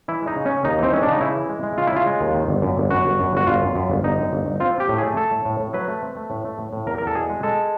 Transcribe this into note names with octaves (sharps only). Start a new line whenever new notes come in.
E3 E4
G#3
D#4
C#3
C#4
C#3
D#2 D#4
E3 C4
G#3 C#4
C#3 D4
D#4
C#3 E4
E3
G#3
G#3
C#3 F4
E4
C#3 F4
G#3
D#2
D#3
G1
F#2
G1
F#2 F#4
G1
F#2
G1 F#4
G1 F4
F#2
F#2
G1
G1 D#4
F#2
G1
G1
C4 F4
C4
G4
A2
A3 G#4
A3 A4
A2
A2
A2
F#3 B4
A3
C4
A3
A2
A3
A2
A2
E2 A#4
E2 A#4
A4
B2 G#4
G#3
G#3 A4